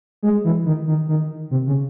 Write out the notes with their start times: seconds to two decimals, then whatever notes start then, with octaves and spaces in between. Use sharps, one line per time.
0.23 G#3
0.44 E3
0.66 D#3
0.87 D#3
1.09 D#3
1.51 C3
1.67 C#3